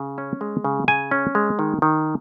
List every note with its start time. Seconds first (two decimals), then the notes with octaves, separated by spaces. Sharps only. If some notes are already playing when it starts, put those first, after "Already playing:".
Already playing: C#3
0.18 C#4
0.41 G#3
0.64 C#3
0.88 C#3 G#5
1.11 C#4
1.35 G#3
1.59 D#3
1.82 D#3